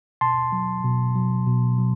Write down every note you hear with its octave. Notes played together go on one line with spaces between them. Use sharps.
B2 A5 C6
F#3
B2
F#3
B2
F#3